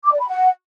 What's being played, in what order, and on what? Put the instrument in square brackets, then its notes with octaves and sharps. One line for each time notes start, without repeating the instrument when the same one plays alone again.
[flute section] D6
D5
B5
F#5